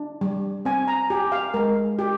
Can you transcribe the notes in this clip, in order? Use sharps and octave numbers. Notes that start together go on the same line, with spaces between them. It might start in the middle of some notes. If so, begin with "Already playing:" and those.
Already playing: D4
G3
C4 G#5
A#5
G4 G#5
F5
G#3 A#4
G4